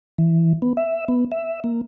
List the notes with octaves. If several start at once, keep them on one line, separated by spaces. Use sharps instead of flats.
E3
B3
E5
B3
E5
A#3